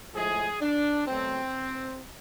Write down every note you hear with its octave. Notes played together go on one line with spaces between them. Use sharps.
A2 F3 G#3 G#4
D4
B2 F#3 A3 C4